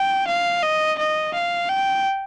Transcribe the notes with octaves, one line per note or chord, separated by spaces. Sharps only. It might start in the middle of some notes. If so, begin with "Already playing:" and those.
Already playing: G5
F5
D#5
D#5
F5
G5